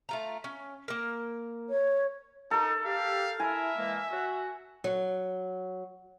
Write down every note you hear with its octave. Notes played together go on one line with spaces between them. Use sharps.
A3 F4 A#5
C#4
A#3 A#4
C#5
D#4 A4 A#4
G4 F5
E4 A#4 E5 G#5
E3 G#3 A#3
F#4
F#3